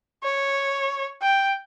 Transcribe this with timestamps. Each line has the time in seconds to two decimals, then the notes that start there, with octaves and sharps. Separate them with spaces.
0.23 C#5
1.22 G5